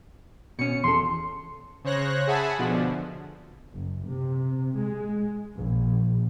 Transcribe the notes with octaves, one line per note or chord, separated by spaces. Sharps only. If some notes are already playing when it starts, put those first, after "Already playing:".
B2 C#4 C#7
E2 A4 C6
C#3 C5 C#5 F#6 A#6
G#4 E5 F#5 G#5 A5 B5
B2 D3 F3
F#1
C3
G#3
A#1